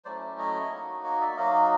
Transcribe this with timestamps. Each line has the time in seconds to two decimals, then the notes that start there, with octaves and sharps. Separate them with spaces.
0.05 F#3 A3 C#4 E4 C5 D5
0.39 C#5 D#5
0.71 A#3 D#4 F#4
1.04 C#5 D#5
1.21 D5 E5
1.37 F#3 A#3 D#4 F#4 D#5 F5